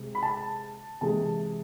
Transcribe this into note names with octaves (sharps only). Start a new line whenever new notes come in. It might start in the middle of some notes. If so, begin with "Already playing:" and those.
Already playing: C3 G#3
B5
A5
C3 E3 G#3 A5